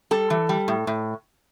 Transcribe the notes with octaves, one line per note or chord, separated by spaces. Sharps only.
G3 A4
E3
G3
A2
A2